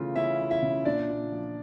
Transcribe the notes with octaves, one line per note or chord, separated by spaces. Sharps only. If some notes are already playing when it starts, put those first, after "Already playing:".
Already playing: C#3 E3 A3 F4
C#4 E4 E5
E3
E4 E5
C#3
A#2 D4 D5
A#2
F3